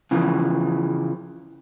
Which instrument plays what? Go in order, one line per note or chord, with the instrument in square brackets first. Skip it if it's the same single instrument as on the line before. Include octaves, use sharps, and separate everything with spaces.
[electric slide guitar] C#3 E3 F3